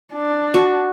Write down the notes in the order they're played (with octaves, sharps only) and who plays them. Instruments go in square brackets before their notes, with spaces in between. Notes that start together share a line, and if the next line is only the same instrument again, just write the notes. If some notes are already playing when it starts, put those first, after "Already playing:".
[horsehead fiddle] D4
[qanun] F#4